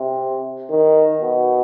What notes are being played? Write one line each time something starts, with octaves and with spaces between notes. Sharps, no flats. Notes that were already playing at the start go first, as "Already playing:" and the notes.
Already playing: C3
D#3
B2